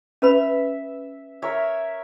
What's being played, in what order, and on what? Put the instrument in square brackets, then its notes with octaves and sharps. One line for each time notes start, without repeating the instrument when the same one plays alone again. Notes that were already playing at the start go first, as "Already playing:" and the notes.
[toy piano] C#4 B4 B5 [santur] E5
[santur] A#4 C#5 E5